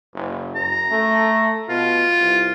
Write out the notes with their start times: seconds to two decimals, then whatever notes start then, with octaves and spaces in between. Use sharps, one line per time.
0.14 F#1
0.55 F#2 A#5
0.91 A3
1.69 B2 F4
2.20 C2